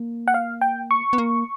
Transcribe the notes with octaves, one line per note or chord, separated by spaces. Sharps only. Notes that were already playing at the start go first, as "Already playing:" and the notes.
Already playing: A#3
F#5
F5
G5
C#6
B3
A#3